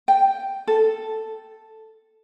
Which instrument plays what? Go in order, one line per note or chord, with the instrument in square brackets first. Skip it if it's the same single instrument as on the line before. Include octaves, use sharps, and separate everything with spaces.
[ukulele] G5
A4